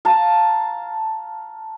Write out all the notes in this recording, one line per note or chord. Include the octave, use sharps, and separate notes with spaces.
F5 A5 A#5